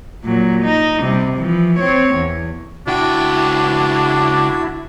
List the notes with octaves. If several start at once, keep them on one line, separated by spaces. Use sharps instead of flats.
A#2 F#3
D#4
C3 G3
E3 F3
C4 C#5
E2
C#2 D4 E4 F#4 G5